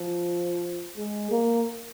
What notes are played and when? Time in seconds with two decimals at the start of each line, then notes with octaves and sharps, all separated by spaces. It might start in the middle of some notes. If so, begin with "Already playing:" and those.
Already playing: F3
0.97 G#3
1.31 A#3